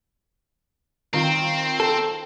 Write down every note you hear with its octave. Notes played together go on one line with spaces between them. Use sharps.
D#3 C4 F4
A4